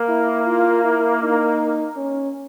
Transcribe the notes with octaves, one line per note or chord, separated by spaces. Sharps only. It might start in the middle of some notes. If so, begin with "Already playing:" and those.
Already playing: A#3
E4
F4
E4
D#4
C#4